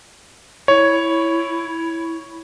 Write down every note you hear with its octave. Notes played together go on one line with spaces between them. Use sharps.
E4 C#5